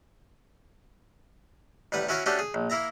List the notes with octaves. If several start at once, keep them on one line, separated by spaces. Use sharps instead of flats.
A1 G3 B4 F#5
C#4 E4 F#4 C#5 F5
A3 C#4 D4 F#4 G4 A4
G#4
A#1
A#3 E4 E5 A#5